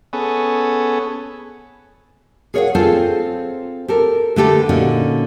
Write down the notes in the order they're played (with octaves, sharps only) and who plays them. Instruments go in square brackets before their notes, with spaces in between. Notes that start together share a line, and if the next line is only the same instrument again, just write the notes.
[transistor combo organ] B3 C#4 G#4 A4
[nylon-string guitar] G#4 A#4 C#5 D#5 F5 F#5
C4 F4 G#4 A4 C5 C#5
G4 A4 A#4
D3 A3 G4 A4 B4
A#2 D3 C#4 D#4 F#4